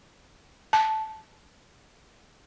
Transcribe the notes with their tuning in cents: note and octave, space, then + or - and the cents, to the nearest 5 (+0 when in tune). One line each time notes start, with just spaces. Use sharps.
A5 -10